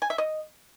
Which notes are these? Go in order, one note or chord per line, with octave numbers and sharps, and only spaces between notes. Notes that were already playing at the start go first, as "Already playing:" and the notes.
G#5
E5
D#5